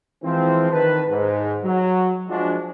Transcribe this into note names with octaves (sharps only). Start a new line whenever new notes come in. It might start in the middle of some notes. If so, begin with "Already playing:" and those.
E3 F3 G#3 C4
D#3 B4 A5
G#2
F#3
F3 G#3 D4 F#4